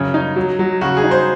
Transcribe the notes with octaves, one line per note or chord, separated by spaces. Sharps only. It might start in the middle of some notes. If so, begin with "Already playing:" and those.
Already playing: F#2 C#3 C#5
D#4
F#3
F#3
C#3 F#4
G#4
D#4
C5